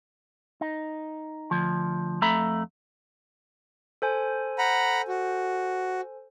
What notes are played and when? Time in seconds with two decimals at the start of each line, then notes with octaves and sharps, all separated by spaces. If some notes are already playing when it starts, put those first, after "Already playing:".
0.61 D#4
1.51 D2 F3
2.22 F2 A3 E5 A#5 B5
4.02 A4 C5 G#5
4.58 F#5 A#5 B5
5.08 F#4